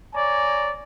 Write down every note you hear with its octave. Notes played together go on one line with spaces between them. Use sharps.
C#5 D5 G#5 A#5